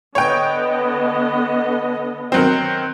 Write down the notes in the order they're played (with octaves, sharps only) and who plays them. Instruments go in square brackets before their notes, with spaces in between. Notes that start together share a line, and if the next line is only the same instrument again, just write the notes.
[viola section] D3 B3 D#5 [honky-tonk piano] C#5 G5
[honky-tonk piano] D#3 F#3 C4